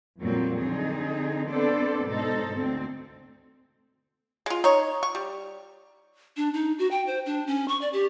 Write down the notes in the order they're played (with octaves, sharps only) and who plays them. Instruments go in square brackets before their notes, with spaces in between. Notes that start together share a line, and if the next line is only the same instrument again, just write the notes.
[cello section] F2 A#2 F#3 G3 A#3 C4
D3 C4 D#4 G#4
B3 C4 D4 A4 C5 D5
G#2 B2 D#4 A4 C5
D2 C4
[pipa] G#3 F4
D#4 C#5
C#6
G3
[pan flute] D4
D#4
F#4
G5
C5
D4
C#4
C#6
D5
G4